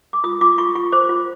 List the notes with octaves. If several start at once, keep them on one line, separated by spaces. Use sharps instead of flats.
D6
F4 D#6
F4 D6
F4 C#6
F4 C#6
C5 D6
F4